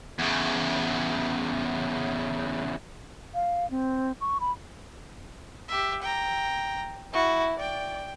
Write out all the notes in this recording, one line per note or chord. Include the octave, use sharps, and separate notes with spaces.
E2 C#3
F5
C4
C#6
B5
G4 E5
G5 A#5
E4 F#4
D5 G5